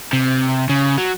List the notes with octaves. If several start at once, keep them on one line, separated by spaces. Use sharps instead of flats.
C3
C#3
F#3